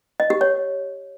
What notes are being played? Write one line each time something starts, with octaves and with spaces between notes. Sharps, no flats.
D#5
G4
C#5